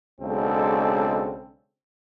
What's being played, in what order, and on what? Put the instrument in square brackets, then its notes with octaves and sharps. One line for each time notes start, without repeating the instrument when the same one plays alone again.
[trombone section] B1 C#3 G#3 C4 D4 A4